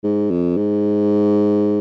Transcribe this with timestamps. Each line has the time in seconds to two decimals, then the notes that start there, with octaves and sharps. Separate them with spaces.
0.04 G#2
0.31 F2
0.57 G#2